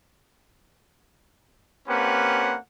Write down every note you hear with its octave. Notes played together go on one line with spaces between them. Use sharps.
A#3 C4 C#4 G4 B4 F#5